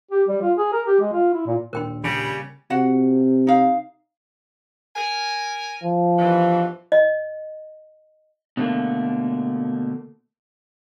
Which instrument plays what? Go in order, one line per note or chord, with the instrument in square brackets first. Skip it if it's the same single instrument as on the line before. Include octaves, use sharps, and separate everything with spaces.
[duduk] G4
G3
F4
G#4
A#4
G4
G#3
F4
E4
A#2
[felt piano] D#1 D4 [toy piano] A#4 G5 C6
[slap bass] C#3 [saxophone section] G3
[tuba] C3 [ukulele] F#4 F#5
[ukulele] D#4 F5
[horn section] A#4 G#5
[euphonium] F3
[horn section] G2 B2 E3
[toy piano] D#5
[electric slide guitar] B2 D3 A3 A#3